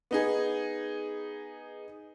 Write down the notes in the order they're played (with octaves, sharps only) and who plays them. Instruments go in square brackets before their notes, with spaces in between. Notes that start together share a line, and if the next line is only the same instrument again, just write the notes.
[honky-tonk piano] B3 D#4 G#4